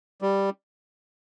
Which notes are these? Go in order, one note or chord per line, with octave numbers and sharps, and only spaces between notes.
G3